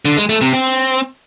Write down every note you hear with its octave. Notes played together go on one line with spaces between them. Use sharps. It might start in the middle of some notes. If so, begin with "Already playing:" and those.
D3
G#3
A3
C3
C4